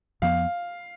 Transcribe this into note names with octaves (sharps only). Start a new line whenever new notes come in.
F2 F3 B3 F5